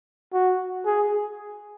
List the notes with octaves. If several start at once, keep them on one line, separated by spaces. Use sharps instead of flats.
F#4
G#4